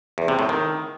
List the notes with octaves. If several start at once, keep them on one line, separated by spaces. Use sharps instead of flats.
E2
C3
A2
D#3